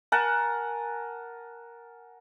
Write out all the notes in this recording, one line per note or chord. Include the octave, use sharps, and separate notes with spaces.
A#4 F#5 G#5 A5